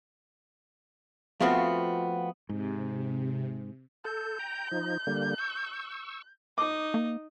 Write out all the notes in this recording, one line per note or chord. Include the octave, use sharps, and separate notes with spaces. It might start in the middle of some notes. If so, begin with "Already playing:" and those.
F3 A3 B3 C4 F4 F#4
G#2 C3
A4 G6
G5 A#5
F3 D#4
D3 G3 A#3
C#6 E6
D#4 D#5 D6
A#3